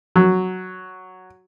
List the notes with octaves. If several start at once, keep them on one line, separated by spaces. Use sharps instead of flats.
F#3